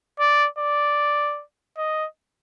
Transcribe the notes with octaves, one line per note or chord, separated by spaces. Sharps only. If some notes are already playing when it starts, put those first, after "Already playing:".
D5
D5
D#5